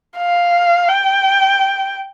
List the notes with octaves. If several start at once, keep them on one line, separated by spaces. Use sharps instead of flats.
F5
G5